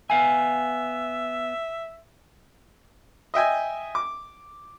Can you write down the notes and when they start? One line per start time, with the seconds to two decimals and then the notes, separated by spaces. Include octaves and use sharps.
0.10 B3 E5 F5 G#5
3.34 D#5 E5 G5 G#5
3.95 D6